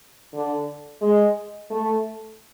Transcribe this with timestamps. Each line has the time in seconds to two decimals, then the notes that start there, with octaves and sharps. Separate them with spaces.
0.34 D3
1.02 G#3
1.70 A3